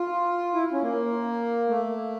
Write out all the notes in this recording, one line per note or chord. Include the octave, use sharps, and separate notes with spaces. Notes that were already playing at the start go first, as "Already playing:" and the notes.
Already playing: F4
E4
C#4
A#3
A3